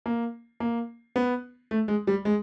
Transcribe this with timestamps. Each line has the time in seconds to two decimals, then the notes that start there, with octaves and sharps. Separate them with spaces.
0.06 A#3
0.60 A#3
1.16 B3
1.71 A3
1.88 G#3
2.07 G3
2.25 G#3